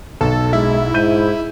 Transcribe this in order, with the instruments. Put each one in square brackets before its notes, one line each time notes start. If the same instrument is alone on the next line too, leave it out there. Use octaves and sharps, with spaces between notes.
[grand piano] B1 [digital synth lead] A4
[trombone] G#3 [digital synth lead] E4
[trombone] G#2 [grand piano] G6 D#7